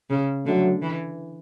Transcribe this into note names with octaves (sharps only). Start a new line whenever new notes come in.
C#3
D3 F#3 A3
E3